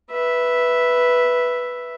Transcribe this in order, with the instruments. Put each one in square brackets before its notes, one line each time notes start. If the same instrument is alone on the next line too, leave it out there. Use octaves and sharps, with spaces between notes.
[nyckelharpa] B4 E5